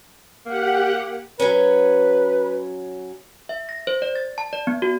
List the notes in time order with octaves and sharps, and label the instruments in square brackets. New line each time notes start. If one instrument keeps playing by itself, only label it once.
[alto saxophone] A#3 [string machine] G4 F#5
[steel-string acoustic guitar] F#3 C#4 [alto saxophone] B4
[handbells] E5
A#6
C5
D5
A6
A5
D5
B3
F#4